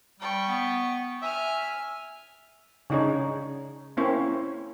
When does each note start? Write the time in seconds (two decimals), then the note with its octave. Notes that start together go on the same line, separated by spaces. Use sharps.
0.20 G3 G5 C#6
0.48 B3
1.22 E5 G#5 F6
2.90 C#3 D4 D#4 G#4 C#5
3.97 A#3 C4 C#4 E4 C5 C#5